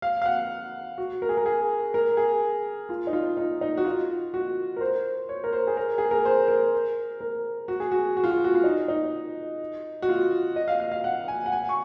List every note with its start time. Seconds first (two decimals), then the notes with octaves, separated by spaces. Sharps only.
0.02 F5
0.22 F5
0.25 F#5
0.98 F#4
1.22 A#4
1.29 G#4
1.37 A#4
1.46 G#4
1.94 A#4
2.17 G#4
2.89 F4
3.07 D#4
3.13 F4
3.37 D#4
3.61 D#4
3.77 F#4
3.85 F4
4.34 F#4
4.77 A#4
4.81 C5
5.29 C#5
5.44 A#4
5.53 C5
5.67 G#4
5.77 A#4
5.98 G#4
6.11 A#4
6.25 C5
6.48 A#4
7.20 A#4
7.68 F#4
7.80 G#4
7.92 F#4
8.17 F#4
8.24 F4
8.31 F#4
8.44 F#4
8.55 F4
8.64 D#4
8.88 D#4
10.02 F#4
10.09 F4
10.56 D#5
10.68 F5
10.80 F5
10.91 F5
11.04 F#5
11.28 G#5
11.46 F#5
11.52 G#5
11.69 C#6